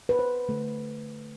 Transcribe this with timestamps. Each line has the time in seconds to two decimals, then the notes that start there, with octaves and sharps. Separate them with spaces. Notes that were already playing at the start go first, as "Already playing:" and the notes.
0.09 B4
0.19 C5
0.49 D3 A3